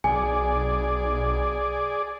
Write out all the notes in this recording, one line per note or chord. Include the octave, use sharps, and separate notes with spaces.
B1 G#4 D5 G#5